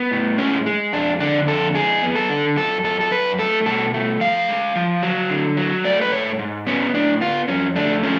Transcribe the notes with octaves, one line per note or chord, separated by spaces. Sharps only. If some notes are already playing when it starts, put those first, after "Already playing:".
Already playing: B3
A2
G#3 C#4
G#3
F2 D4
D3 D4
F2 A4
G#3 G#4
B3
A4
D3
F#2 A4
F#2 A4
A4
F#2 B4
A3 A4
B2 A4
A3
F3 F5
G#3
F3
F#3
D3
F#3
A3 D5
B4
G#2 C#5
G#2
B3 C#4
A2 D4
B3 F4
F2 C#4
A3 D4
F3 C#4